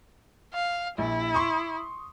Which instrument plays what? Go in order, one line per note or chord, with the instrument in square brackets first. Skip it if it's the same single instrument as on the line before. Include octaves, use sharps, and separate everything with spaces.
[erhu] F5
[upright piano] A#1 [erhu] E4
[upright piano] C6 C#6 D#6